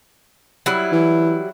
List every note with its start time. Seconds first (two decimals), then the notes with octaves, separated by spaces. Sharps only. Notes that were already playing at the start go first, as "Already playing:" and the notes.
0.66 F#3 G3 E4
0.92 E3